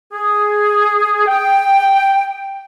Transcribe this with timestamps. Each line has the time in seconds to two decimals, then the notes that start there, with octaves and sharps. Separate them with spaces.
0.12 G#4
1.27 G5